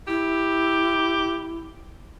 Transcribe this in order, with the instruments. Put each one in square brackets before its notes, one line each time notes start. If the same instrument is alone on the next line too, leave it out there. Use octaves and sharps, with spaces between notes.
[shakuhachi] E4 [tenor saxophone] G4